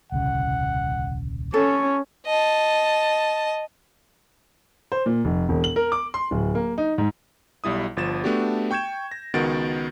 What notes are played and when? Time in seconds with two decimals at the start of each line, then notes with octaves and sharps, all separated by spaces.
0.12 D#1 C2 C#3 F#5
1.54 C#4 A4 C#6
2.26 D#5 A5
4.92 C5
5.06 A#2
5.25 F1
5.49 E1
5.64 F#7
5.76 A#4
5.92 D6
6.14 C6
6.31 D1
6.55 A#3
6.78 D#4
6.98 G#2
7.64 B1 G3 E4 D#6
7.97 G1 F3 A6 E7
8.24 A3 B3 D4 F#4 G4
8.71 G5 C#6 G6 G#6 E7
9.11 A#6
9.34 C#2 D#3 B3 F#4 A6 D7